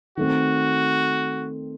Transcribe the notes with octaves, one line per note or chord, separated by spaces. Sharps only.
D#3 A3 C4 F#4